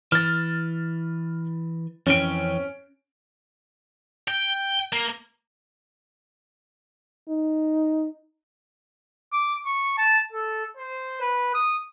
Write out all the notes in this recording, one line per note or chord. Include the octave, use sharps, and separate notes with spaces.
E3 F6 A6
F2 E3 C4 C#4 D7
G5
A#3
D#4
D6
C#6
A5
A4
C5
B4
D#6